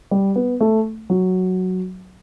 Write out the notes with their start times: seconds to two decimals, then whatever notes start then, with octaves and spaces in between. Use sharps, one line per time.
0.11 G3
0.36 B3
0.61 A3
1.10 F#3